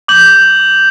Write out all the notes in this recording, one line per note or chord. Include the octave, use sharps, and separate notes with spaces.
D6 G6 F#7